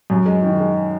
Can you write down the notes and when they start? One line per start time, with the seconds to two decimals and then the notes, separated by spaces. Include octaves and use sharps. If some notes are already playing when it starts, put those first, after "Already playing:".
0.10 F#2
0.26 G#3
0.43 D#3
0.59 G#3